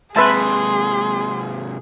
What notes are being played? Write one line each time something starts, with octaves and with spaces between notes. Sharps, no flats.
G#2 C3 G#4 B4 E5 A5 C6